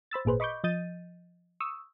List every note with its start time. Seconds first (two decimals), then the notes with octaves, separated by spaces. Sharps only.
0.11 C5 B5 E6 A6
0.25 G#1 A#2 G#4 B4 C5
0.40 D#5 B5 C#6 D6 G6
0.64 F3 D#5 G6 A6 D#7
1.60 C#6 D#6 E6